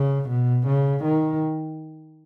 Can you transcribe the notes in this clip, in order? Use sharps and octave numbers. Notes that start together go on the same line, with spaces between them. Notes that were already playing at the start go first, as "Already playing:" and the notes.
Already playing: C#3
B2
C#3
D#3